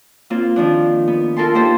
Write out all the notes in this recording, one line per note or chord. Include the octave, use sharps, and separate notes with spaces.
A#3 C4 F4
D#3 F3 D4
B3
F4 A4 A#4 A5 C6
A#3 D#4 G4 A4 C5